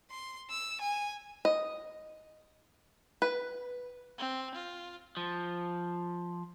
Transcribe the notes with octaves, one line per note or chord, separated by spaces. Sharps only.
C6
E6
G#5
D#5
B4
C4
F4
F3